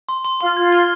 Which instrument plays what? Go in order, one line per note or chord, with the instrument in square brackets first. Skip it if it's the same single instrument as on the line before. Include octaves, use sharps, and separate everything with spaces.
[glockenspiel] C6
C6
[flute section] F4 [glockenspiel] C6
[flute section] F4 [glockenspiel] G#6
[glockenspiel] G7